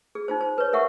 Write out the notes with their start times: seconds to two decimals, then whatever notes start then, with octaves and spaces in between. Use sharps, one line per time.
0.15 G#4
0.28 D#4 F4 C5
0.41 C5
0.58 B4 C#5
0.73 A#4 E5 F#5 C#6